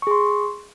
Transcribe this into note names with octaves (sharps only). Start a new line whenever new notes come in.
G#4 C6 C#6